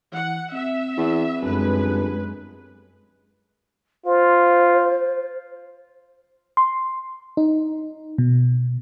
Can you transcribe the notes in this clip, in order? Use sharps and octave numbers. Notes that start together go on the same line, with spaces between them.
E3 F#5
C4 E5
E2
G1 F#2 G#3 B4
F4 C5
C6
D#4
B2